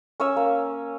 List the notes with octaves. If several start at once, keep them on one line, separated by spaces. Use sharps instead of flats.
C#4 C#5 G#5 E6
A#3